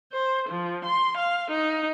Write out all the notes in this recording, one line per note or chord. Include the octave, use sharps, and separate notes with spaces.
C5
F3
C6
F5
D#4